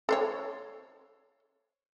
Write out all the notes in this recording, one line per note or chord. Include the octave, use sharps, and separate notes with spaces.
A4 C5 C#5